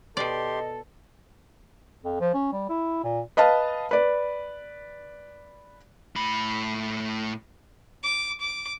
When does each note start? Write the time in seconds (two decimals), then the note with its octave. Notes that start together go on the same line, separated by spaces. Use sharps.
0.17 B2 G4 A4 D5 D#5 C6
2.04 F2
2.20 F3
2.34 C#4
2.53 G3
2.69 E4
3.04 A#2
3.37 B4 D#5 F5 A5
3.91 B4 D5
6.16 A2 B5
8.04 D6
8.41 D6